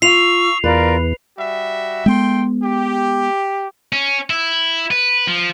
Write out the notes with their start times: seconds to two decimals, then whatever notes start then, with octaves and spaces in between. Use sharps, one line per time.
0.02 F4 C#6 E6 C7 F7
0.64 E2 F4 A#4 B4 D5
1.37 G3 F#4 E5
2.06 G#3 A3 B3 G5 C6
2.62 G4
3.93 C#4
4.30 E4
4.91 B4
5.27 F3